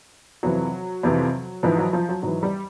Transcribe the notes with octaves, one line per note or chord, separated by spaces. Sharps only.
F2 C3 E3 F#3
F2 C3 E3
G#2 E3 F3
F#3
F3
F#3
G#2 E3 F#3
G3